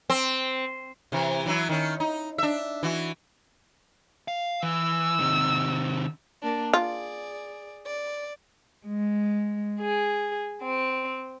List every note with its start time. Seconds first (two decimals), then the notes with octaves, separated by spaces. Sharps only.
0.10 C4
1.12 C3 E3
1.46 E3 F#3 E4
1.69 D#3 C#4
2.00 D#4
2.38 D4 E5
2.83 E3 F#4
4.28 F5
4.63 E3 E6
5.19 C3 D#3
6.42 A#3 D4 A#4
6.74 F4 G#4 D5
7.86 D5
8.85 G#3
9.80 G#4
10.62 C4